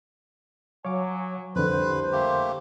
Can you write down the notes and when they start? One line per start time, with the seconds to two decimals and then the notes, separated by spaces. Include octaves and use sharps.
0.85 F#3 C#5 F5 G#5 D6
1.56 C2 F2 D3 B4 C5
2.12 A3 A#3 G4